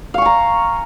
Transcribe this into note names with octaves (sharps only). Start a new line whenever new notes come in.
F5 G#5 A#5 C#6